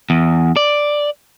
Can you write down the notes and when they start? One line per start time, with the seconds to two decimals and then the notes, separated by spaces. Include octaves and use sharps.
0.10 E2
0.56 D5